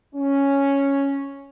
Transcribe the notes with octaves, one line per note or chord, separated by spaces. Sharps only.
C#4